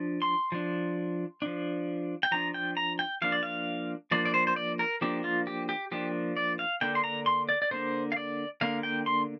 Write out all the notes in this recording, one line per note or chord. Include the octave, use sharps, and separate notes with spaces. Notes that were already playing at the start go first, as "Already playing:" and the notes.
Already playing: F3 D4
C6
F3 D4
F3 D4
G5
F3 D4 A#5
G5
A#5
G5
F3 A#3 D4 F5
D5
F5
F3 A#3 D4 D5
D5
C5
C5
D5
A#4
F3 A#3 D4 G4
F4
G4
G4
F3 A#3 D4 G4
D5
F5
D3 A#3 D4 G5
C6
A#5
C6
D5
D5
D3 A#3 D4 C5
F5
D5
D3 A#3 D4 F5
G5
C6